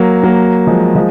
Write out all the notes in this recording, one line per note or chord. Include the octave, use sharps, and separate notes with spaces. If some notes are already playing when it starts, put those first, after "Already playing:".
Already playing: F#3 A#3
F#3 A#3
F3 G#3
F3 G#3